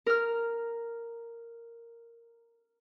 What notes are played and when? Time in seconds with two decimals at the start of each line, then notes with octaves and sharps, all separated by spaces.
0.06 A#4 F6